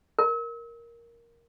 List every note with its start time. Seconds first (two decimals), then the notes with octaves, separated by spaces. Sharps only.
0.19 A#4